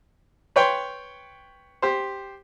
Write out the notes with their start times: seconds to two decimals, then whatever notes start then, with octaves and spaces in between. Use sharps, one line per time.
0.56 B4 C#5 G5 C6
1.82 G4 C5